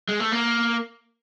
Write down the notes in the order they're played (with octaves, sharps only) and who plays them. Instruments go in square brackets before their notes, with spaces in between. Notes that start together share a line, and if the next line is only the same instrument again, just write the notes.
[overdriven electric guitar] G#3
A3
A#3